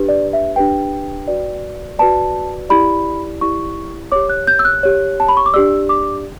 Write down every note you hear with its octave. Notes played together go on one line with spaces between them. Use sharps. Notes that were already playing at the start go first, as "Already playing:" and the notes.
Already playing: D4 G4 B4
D5
E5
D4 G4 B4 G5
F#4 B4 D5
F#4 B4 D5 A5
E4 G4 D5 B5
E4 G4 D5 C#6
G4 C#5 D6
F#6
G6
E6
F#6
G4 C#5
A5
B5
C#6
D6
D4 G4 D5 E6
D6